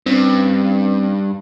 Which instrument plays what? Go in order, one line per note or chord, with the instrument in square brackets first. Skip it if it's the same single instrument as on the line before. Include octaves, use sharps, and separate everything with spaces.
[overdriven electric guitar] G2 [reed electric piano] C4 C#4